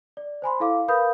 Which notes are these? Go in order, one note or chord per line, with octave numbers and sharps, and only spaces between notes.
D5
C5 G#5 B5 C6
E4 A4 F5 D6
A#4 B4 F5 B5 D#6 G6